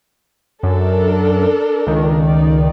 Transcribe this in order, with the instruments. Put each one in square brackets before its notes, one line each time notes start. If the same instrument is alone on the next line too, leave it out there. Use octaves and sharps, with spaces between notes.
[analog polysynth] F#2 [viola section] D4 A4 A#4
[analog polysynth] C#2 D#3
[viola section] D#4 D5